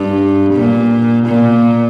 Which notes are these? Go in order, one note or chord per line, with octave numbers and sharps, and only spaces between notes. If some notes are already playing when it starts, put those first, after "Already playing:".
Already playing: G2
A#2
A#2